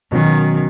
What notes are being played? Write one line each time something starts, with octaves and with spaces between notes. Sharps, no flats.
B2 D#3 F#3 C#4 F#4